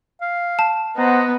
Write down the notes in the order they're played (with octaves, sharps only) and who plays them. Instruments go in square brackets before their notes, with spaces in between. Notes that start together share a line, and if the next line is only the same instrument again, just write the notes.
[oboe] F5
[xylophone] A5
[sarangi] B3 [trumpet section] C5 F#5 A#5 [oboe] D#5